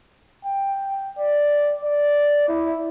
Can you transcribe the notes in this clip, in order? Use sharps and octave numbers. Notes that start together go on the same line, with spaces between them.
G5
D5
D5
E4